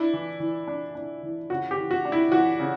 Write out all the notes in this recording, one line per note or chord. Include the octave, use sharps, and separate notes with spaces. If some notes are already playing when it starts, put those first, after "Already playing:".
Already playing: D4 E4
E3
E3
D4
D4
E3
C#3 F#4
G4
E3
F#4
D4
E4
E3 F#4
C#3